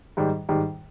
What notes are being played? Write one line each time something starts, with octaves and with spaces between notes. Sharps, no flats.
G#2 D#3 G3
G#2 D#3 G3